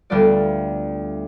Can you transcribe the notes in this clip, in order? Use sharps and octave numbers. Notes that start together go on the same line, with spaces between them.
D2 G3 A3 B3 F4 D5